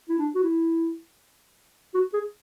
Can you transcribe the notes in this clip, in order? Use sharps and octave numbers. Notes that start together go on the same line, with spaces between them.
E4
D4
F#4
E4
F#4
G#4